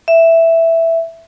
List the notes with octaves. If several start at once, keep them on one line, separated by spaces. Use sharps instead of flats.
E5